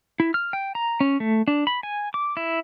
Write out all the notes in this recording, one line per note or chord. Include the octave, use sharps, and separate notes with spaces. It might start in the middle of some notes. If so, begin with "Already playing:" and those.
E4
F6
G5
A#5
C#4
A3
D4
B5
G#5
D6
E4